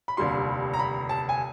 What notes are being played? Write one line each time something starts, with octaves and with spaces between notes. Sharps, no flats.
B5
F1 D#2 D3 G3 C6
A#5
B5
A5
G#5